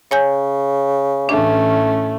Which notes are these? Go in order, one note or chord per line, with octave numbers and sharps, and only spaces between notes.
C#3 C#5 G#5 G6
A1 A3 C#4 D4